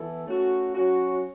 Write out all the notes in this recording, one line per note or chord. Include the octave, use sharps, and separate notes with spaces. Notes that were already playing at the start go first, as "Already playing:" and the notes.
Already playing: E3 B3 E4 A4
A3 C#4 F#4
F#3 C#4 F#4